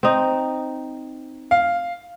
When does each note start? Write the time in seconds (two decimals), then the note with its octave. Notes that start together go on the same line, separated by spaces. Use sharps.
0.03 C4 D#4
1.51 F5